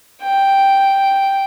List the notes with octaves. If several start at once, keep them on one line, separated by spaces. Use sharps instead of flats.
G5